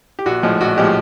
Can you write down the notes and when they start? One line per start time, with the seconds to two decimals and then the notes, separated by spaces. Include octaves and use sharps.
0.19 G4
0.26 A#1 F#4
0.43 A2 F3 G#3
0.60 A#1 F#4
0.77 A2 F3 G#3 G4